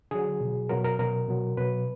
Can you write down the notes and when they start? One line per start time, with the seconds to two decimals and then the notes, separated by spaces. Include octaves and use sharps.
0.11 D3 F#3 G#4
0.40 B2 F#3
0.69 B2 F#3 A#4
0.84 A#4
0.99 B2 F#3 A#4
1.28 B2 F#3
1.57 B2 F#3 B4